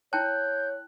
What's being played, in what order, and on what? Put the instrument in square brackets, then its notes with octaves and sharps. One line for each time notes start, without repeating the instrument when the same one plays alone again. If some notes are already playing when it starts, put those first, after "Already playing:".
[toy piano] E4 G5 A5 [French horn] C#5 [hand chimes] F#6 [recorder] G6